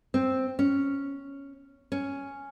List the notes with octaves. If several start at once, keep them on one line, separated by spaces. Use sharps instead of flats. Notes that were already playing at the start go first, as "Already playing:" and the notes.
C4
C#4
C#4